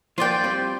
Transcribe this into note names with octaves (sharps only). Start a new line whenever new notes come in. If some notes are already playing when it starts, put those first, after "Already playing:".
F3 A#3 F4 D5 G5
G3 C4